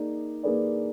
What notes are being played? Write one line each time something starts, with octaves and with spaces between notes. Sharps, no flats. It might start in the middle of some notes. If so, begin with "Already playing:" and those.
Already playing: A#3 D#4 G#4 D5
A#3 D#4 G#4 B4 D5